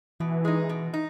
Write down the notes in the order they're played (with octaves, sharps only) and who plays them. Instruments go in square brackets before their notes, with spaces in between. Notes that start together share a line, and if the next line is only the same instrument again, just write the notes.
[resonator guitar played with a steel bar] B2 [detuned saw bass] E3
[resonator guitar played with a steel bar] G#3 D#4
B2
D#4